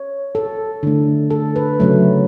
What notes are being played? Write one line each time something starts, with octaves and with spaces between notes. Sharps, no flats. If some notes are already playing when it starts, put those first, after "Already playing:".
Already playing: C#5
A4
D3 A3
A4
B4
C#3 F#3 A3